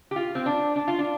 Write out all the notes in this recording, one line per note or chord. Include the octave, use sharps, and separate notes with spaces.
G4
F4
C4
D4
D4
F4
D4